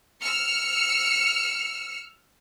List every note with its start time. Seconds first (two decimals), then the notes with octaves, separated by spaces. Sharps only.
0.21 E6 F6 C#7